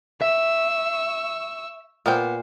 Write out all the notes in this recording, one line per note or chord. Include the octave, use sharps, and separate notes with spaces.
E5 C#6 E6
A#2 B3 A#4 C5 G5